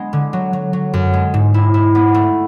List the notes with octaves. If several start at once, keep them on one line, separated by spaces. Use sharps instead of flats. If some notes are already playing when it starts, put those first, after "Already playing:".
Already playing: G#3 B3 D4
D3
F#3
F#3
F#3
F#2
G#3
G#2
E4
E4
B3
A3